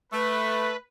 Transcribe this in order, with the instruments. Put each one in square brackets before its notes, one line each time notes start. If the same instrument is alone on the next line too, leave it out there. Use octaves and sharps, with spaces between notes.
[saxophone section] A3 [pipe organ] B4